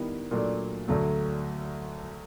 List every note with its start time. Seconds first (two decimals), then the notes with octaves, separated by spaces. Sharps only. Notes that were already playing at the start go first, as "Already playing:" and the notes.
Already playing: D#3 G3 B3 E4
0.31 A#2 F#3 A3 D4
0.88 D2 D3 F#3 A3